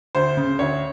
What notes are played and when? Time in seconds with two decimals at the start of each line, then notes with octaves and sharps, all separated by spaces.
0.15 D2 C5
0.37 C#3
0.59 D2 C#5